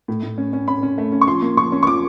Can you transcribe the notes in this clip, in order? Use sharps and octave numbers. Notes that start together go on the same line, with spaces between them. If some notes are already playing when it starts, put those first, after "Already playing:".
A2
A2
C#4
C#4
C#4 B5
C#4
A3
C#4
C#6
F3 C6
A#3
F3 C#6
C#4
C#6
F3 D6